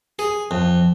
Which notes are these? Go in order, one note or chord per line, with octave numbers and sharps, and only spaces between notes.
G#4
F2